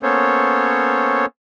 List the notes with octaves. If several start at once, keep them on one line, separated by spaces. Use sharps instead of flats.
A#3 B3 C#4 A4 C5 C#5